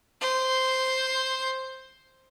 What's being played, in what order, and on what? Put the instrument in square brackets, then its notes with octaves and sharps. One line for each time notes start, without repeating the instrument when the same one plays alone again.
[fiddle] C5